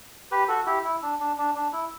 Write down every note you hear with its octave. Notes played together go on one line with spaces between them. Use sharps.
G4 B4
F#4 A4
E4 G4
E4
D4
D4
D4
D4
E4